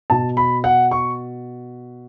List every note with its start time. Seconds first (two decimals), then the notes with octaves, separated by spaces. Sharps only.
0.10 B2 A5
0.37 B5
0.64 F#5
0.91 C#6